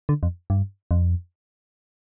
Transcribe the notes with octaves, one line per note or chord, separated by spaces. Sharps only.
D3
F2
G2
F2